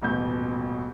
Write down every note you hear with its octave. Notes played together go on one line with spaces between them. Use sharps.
D#1 A1 B2 G6